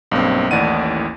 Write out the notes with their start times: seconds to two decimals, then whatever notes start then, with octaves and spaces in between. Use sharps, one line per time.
0.11 B1 G2 A#3 C4
0.51 A1 D#2 A2 D5 F#5 D#7